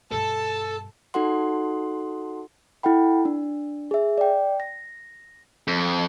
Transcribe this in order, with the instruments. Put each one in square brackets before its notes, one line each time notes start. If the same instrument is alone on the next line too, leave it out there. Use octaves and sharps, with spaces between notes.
[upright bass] G2 B2 [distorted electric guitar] A4 [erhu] A5
[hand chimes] D#4 F#4 A4 F#5 C6
E4 A4 F#5 G5 B5
D4
G#4 E5
D5 G5
A#6
[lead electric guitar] F2